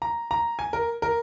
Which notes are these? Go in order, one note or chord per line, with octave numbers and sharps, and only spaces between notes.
A#5
A#5
G#5
A#4
A#4